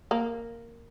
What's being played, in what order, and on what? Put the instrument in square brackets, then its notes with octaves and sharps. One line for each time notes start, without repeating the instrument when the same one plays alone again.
[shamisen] A#3